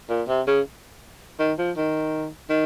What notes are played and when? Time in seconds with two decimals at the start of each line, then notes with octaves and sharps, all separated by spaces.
0.10 A#2
0.28 C3
0.47 C#3
1.40 D#3
1.58 F3
1.77 D#3
2.50 D#3